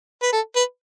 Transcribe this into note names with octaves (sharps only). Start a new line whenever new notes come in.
B4
A4
B4